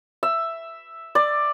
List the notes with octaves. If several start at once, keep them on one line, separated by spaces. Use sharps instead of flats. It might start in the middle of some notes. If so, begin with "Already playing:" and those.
E5
D5